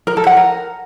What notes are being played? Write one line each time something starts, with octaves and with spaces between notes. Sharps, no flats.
A#4
A4
F#5
A#4